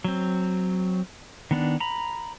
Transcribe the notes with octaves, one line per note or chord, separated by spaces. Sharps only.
F#3 C4
D#3 B3 D4
A#5 B5